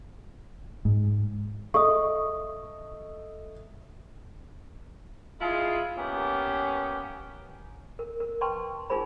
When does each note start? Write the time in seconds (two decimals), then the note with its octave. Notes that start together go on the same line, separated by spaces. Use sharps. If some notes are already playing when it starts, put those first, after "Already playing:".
0.85 G#2
1.74 A4 D#5 E5 C#6 D#6
5.40 G#3 E4 F4 G#4
5.98 A#3 B3 C#4 G4
7.99 A#4
8.20 A#4
8.41 B4 G5 A5 C6 C#6
8.90 D#4 F4 G#4 A#4 C5 B5